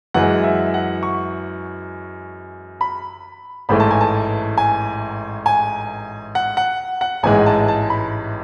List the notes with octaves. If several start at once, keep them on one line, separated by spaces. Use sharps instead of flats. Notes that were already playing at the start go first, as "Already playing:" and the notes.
F#2 E3 G#3 F#5
E5
F#5
C#6
B5
A1 G#2 E3 A3 B5
A5
G#5
A5
G#5
G#5
F#5
F#5
F#5
A1 G#2 E3 G#3 G#5
A5
A5
B5